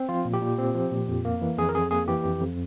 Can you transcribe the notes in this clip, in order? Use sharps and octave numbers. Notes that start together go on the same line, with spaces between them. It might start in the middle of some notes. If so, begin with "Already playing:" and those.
Already playing: C4
F3 F4
A#2
G4
A#2
C4
F3
A#2
F2
A#3
E3
F2 G#4
A#4
F2 G#4
A#3 G#4
E3 G4
F2
F2